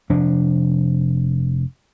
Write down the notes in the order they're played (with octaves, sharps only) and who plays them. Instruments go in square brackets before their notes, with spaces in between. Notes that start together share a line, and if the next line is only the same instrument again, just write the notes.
[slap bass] F1 F3 D4